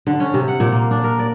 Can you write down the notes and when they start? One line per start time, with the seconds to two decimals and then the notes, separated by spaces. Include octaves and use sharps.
0.07 D3
0.20 C#4
0.34 C3
0.48 F#5
0.60 A#2
0.72 A#3
0.91 D4
1.04 A#4
1.19 D5